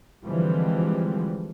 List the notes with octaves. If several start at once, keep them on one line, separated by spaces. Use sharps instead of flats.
D3 E3 F3 G3 G#3 C4